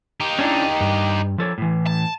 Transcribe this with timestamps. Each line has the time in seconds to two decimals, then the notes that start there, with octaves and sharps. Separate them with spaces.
0.20 D#4 G4
0.39 C#4 D4 E4
0.81 G2
1.38 F3 A4 C#5
1.58 A2 E3
1.87 A5